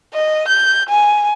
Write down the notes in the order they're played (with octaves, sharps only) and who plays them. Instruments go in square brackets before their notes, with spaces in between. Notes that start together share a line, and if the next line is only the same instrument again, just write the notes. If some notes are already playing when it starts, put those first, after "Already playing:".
[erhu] D#5
G6
G#5